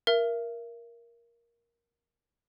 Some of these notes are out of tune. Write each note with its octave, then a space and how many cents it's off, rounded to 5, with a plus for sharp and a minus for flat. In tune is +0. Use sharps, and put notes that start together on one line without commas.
A#4 +10 E5 +35